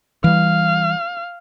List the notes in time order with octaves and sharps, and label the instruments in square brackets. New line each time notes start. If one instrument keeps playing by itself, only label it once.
[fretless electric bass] E3 G3 [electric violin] F5